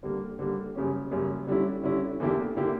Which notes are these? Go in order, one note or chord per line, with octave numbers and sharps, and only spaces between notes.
D3 G3 A#3
D3 G3 A#3
F#2 C#3 G3 A#3 C#4
F#2 C#3 G3 A#3 C#4
D3 G3 C#4 E4
D3 G3 C#4 E4
E2 D3 A#3 E4 G4
D3 A#3 E4 G4